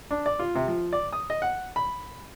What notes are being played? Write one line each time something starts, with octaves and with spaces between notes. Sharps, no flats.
D4
D5
F4
C3
F3
D5
D#6
D#5
F#5
B5